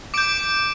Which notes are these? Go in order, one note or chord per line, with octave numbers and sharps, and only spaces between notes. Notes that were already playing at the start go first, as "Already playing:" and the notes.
D6 G6 D7
D7